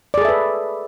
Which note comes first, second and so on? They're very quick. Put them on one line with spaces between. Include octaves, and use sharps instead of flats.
D5 G#4 A4 E5 B4